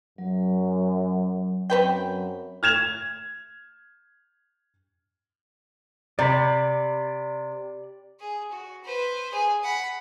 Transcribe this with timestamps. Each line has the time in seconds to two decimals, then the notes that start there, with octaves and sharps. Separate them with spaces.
0.18 F#2 F#3
1.70 F#2 C4 B4 G5
2.63 F6 G#6 E7 F7
6.19 C3 D5 B5
8.20 G#4
8.52 F#4
8.84 B4 C5
9.32 G#4 G#5
9.63 F#5 B5